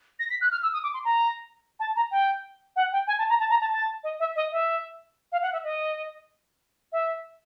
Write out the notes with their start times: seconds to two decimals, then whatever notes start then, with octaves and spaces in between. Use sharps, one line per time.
0.19 A#6
0.30 B6
0.41 F#6
0.51 F6
0.63 E6
0.73 D#6
0.83 D6
0.94 C6
1.05 A#5
1.80 A5
1.96 A#5
2.11 G5
2.76 F#5
2.92 G5
3.07 G#5
3.19 A5
3.29 A#5
3.40 A5
3.50 A#5
3.61 A5
3.72 A5
4.04 D#5
4.20 E5
4.36 D#5
4.52 E5
5.32 F5
5.42 F#5
5.53 E5
5.64 D#5
6.92 E5